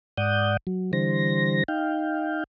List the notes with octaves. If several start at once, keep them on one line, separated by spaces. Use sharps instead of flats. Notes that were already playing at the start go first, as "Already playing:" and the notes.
G#2 D5 F#5 D#6 G6
F#3
D3 E3 G3 C5 A#6
D#4 F5 G5